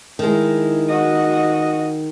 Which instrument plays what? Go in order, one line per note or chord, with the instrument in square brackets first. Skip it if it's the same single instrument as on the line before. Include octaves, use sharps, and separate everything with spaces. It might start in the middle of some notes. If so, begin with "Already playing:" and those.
[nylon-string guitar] D#3 G#3 [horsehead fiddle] E4
[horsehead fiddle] F#4 D#5